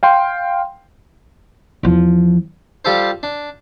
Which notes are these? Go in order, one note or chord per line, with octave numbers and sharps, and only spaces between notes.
F5 G5 C6
E2 F3
G3 F4 G4 A4 C5
D4